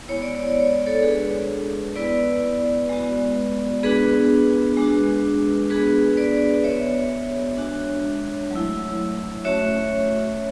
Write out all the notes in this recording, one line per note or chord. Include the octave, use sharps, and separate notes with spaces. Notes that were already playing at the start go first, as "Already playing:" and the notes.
G#3 B3 E4 C#5
D5
C#5
D5
C#5
D5
A4 C#5
G#3 D4 F#4 G#4 B4
B3 E4 B4 D5
G#3 B3 F#4
B3 D4 F#4 G#4 B4
G#3 D4 F#4
B3 D4 F#4 G#4 B4
B4 D5
B3 F#4 C#5 E5
G#3 D4 F#4
F#3 A3 E4
A3 C#4 F#4 C#5 E5